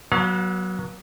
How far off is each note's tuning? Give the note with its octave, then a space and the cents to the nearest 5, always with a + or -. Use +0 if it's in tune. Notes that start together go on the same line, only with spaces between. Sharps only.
F#3 +0 B3 -40 F5 +40